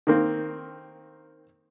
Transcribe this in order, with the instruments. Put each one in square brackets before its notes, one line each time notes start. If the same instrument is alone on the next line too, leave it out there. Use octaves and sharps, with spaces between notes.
[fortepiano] D#3 A#3 C4